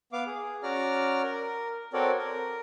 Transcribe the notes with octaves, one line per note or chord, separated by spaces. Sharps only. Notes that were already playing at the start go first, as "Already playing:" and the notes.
B3 F5 D6
G#4
C#4 F#4 D5 A#5 F6
A#4
C4 F#4 A4 A#4 C#5 D5
A#4